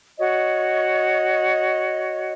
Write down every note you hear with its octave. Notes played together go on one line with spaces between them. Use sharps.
F#4 C#5 D#5